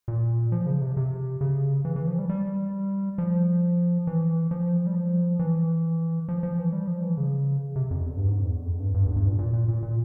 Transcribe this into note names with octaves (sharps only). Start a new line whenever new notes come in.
A#2
F3
C#3
C3
C3
C#3
E3
E3
F3
G3
G3
F3
E3
F3
G3
F3
E3
F3
F3
E3
G3
F3
E3
C#3
C3
F2
E2
G2
G#2
F2
E2
F2
G2
G2
E2
G2
A#2
A#2
A#2
A#2
A#2